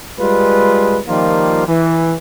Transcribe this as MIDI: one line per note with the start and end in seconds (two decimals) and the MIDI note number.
0.19 0.98 55
0.19 0.98 56
0.19 0.98 65
0.19 0.98 71
1.07 1.63 51
1.07 1.63 53
1.07 1.63 55
1.07 1.63 58
1.07 1.63 65
1.67 2.13 52